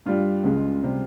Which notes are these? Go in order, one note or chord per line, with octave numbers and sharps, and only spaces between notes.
G2 G3 F4
C#2 C#3 G#3
C3 G3